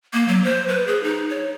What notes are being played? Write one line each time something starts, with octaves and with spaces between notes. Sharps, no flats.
A#3
F#3
C5
B4
G#4
D#4
C#5